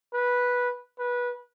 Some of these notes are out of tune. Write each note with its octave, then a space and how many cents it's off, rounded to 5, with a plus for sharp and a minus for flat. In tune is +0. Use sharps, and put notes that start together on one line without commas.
B4 -10
B4 -20